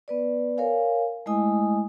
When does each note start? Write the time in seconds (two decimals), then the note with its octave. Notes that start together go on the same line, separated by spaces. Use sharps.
0.08 B3 B4 D5
0.57 A#4 C#5 F5 G#5
1.26 G#3 A3 E4 D#5 G#5 D#6